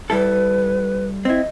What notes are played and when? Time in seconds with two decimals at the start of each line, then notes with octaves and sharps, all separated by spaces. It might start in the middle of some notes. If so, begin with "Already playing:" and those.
0.10 G3 E4 A4 B4
1.25 C4 E4 D#5